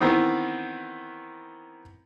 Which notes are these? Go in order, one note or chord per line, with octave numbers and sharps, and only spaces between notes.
D#3 E3 B3 C4 D#4